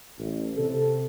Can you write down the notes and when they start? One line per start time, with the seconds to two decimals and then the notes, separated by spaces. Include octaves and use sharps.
0.18 A1
0.58 C3 A4